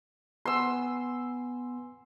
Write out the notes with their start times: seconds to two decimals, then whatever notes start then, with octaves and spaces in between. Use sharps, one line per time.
0.45 B3 G#5 C6 E6